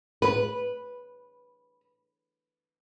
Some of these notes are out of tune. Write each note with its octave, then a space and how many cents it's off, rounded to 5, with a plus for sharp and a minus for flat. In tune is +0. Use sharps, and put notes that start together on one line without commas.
B4 -10